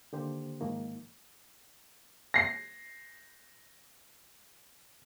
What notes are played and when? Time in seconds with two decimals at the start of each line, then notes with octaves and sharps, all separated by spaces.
0.13 D3 D#3 A#3 G4 C5
0.61 G#2 D#3 F3 A#3
2.34 A#6 C7